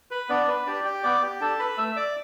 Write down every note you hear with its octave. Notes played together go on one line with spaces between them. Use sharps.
B4 B5
B3 D4 D5
B4
D4 G4 D5
G4 G5
B3 D5 D6
G4 G5
D4 G4 A4 A5
B4 B5
A3 E5 E6
D5 D6